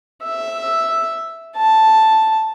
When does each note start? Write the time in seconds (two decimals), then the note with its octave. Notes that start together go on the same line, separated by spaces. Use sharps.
0.23 E5
1.56 A5